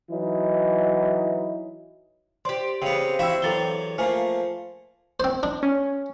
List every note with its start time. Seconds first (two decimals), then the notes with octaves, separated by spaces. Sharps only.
0.10 E3 F#3 D#4 E4
2.45 G4 C5 D5 C6
2.82 C#3 B3 C4
3.19 E4 F#4 E5 F5 G5 E6
3.42 E2 F#3 A4 A6 G7
3.98 F3 A3 A#3 C5 G#5
5.20 C4 C5
5.43 D4
5.63 C#4